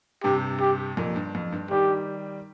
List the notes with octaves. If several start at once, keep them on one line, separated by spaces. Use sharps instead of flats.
G2 C3 G4
G4
F2 A#2
G2
F2
G2
D#3 G3 G4